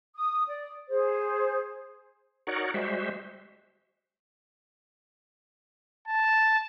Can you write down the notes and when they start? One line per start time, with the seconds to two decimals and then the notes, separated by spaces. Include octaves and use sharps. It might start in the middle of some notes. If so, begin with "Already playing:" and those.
0.15 D#6
0.47 D5
0.89 G#4 C5
2.47 D#4 F#4 A#4 C#5 D5 F#5
2.74 G3 G#3 F#4 C5 E5
6.08 A5